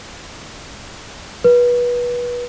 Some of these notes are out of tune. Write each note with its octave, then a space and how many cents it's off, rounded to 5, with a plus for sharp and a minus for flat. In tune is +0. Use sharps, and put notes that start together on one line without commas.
B4 -25